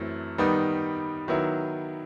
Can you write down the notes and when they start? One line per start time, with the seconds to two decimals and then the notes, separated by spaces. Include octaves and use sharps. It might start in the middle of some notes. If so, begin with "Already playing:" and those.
Already playing: F#2 E3 A3 C4
0.38 D#3 G3 B3 D#4
1.28 D#3 F#3 B3 E4